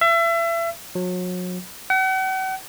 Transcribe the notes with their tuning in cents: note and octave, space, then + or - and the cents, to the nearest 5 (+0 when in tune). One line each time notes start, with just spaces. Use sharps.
E5 +30
F#3 -35
F#5 +40